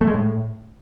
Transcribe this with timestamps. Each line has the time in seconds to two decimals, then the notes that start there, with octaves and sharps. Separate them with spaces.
0.01 A3
0.07 G#3
0.14 A2